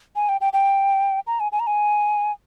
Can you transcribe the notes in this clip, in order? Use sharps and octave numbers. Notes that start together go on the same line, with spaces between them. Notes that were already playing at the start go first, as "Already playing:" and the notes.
G#5
G5
G5
G5
A#5
G#5
G#5
A#5
G#5